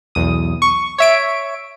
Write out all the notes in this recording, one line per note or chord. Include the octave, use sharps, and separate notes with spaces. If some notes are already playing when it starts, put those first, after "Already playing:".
B1 E2 D#6
C#6
C#5 E5 D7